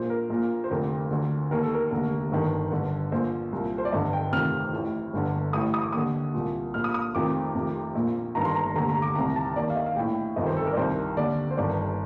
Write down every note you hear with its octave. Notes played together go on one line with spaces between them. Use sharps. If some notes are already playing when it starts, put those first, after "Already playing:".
Already playing: A#1 A#2 C5
A#4
A#1 A#2
C5
F1 F2 D3 A#4
D2 D3
D#2 D#3 A#4
A4
A#4
F1 D#2 D3
G1 G2 D#3
G1 G2 D3
A#1 A#2 C5
C2 A#2
C5
D5
G1 G2 D3 D#5
G5
F1 F2 C3 D#3 F6
A1 A2
G1 G2 D3
A1 A2 D#6
D#6
D6
D#2 D3 D#6
C2 A#2
A#1 A#2 F6
D#6
D#6
F1 F2 C3 D#3 D6
F1 F2 C3 D#3
A#1 A#2
G1 G2 D#3 A#5
C6
A#5
F1 D#2 D3 A#5
A#5
D6
C2 C3 D#3 A#5
A5
D#2 D#3 D5
F5
D#5
F5
A#1 A2 G5
G1 F2 C3 D#3 D#5
C5
A4
A#4
D5
C2 C3 D#3 C5
D#2 D3 D5
C5
G1 G2 D#3 D5